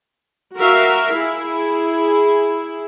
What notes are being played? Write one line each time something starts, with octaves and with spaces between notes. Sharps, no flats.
F#4 A#4 E5 F5
E4 G#4